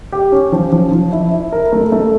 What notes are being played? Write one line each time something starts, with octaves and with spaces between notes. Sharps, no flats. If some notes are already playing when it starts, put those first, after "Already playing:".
G4
C#4
F3
F3
F3
E4
E4
A#4
A3
A3